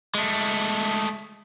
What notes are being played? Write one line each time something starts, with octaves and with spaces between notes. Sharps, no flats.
G#3 A3